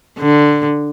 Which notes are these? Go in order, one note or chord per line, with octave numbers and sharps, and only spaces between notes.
D3